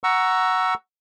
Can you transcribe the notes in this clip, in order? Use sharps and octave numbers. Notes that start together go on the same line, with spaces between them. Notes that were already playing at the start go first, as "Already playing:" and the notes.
F#5 A#5 C#6 E6